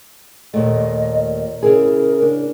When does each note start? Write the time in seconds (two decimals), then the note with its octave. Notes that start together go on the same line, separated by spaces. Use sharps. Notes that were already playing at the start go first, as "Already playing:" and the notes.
0.54 D#2 A#2 A3 D#5
1.63 C#3 E4 G#4 A#4
2.22 D4